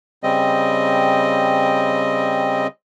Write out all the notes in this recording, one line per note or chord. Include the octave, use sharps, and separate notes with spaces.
C#3 G3 C4 D#5